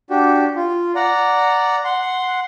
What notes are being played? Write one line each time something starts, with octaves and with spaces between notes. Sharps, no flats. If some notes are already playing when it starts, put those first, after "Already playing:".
D4 F#4 G4
F4
D5 F#5 A#5
F#5 C6